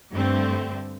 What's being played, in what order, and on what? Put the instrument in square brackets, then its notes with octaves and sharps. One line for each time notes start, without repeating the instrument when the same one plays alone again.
[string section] G2 D3 A3 C4